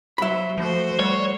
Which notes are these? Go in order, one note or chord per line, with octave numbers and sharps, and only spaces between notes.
F#3 C5 E5 B5
F3 A3 F#4 C5
G3 C#5